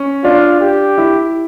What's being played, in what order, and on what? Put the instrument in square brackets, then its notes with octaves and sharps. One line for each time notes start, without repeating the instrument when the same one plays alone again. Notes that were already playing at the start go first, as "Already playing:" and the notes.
Already playing: [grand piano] C#4
[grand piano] D4 [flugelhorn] F4
[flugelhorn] G4
[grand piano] E4